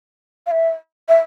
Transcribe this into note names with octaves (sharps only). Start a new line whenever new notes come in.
F5
E5
E5